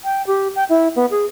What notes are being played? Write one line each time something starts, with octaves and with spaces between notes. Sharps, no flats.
G5
G4
G5
E4
B3
G#4